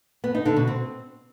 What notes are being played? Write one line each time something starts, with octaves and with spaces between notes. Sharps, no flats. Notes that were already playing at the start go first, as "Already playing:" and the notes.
B3
D#4
D3
B2
C4